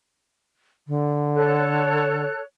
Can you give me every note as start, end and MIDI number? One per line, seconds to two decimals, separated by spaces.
0.88 2.25 50
1.35 2.39 69
1.35 2.39 73
1.35 2.39 90